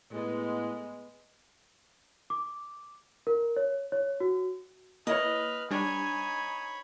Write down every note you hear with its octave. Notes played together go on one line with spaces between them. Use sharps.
A2 G#3 B3
D6
A#4
C#5
C#5
F#4
A#3 E4 B4 C#5 D#5 F6
G3 D4 D#4 C#5 G#5 B5